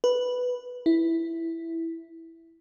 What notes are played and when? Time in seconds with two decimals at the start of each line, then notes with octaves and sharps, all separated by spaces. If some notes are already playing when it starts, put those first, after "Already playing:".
0.04 B4
0.86 E4